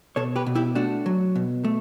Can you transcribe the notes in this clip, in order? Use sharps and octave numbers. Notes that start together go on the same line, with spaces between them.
B2 A4 C#5
G4 B4
B2
E4 G4
A3 D4 F#4
F#3
B2
A3